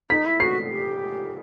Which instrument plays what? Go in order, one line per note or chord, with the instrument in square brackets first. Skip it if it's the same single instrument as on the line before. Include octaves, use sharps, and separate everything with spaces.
[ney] D#4 [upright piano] B6
[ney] E4
[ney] F#4 [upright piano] C7
[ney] G4